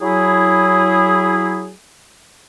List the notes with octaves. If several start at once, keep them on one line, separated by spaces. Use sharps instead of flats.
F#3 E4 G#4